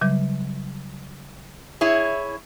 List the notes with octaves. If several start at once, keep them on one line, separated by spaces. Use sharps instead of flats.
C#3 F#3 G3
E4 G#4 C#5